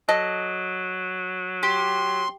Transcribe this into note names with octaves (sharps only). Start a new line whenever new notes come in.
F#3 A4 D#5
G4 C6